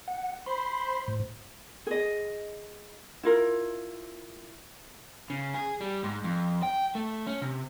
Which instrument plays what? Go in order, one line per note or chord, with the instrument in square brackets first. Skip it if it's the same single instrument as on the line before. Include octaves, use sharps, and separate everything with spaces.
[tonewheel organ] F#5
[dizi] C5 [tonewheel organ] B5 C6
[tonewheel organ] A2
[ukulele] G#4 D#5
E4 F4 A#4
[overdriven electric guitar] C#3
G#4
G3
G#2
F2
G5
A3
C#4
C3